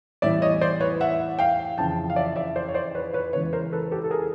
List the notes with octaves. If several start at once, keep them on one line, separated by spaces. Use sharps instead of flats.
A2 E3 G3 B3 D5 E5
C#5 D#5
C5 D5
B4 C#5
E5 F#5
F5 G5
F2 C#3 E3 G5 A5
F5
D5 E5
D5 E5
C5 D5
C#5
C5 D5
B4 C#5
B4 C#5
E2 C#3 E3 G#3 B4 C#5
A#4 C5
A4 B4
G4 A4
A4
G#4 A#4